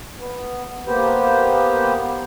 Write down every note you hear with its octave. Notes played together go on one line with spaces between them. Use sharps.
B3
A#3 B3 G4 B4 C5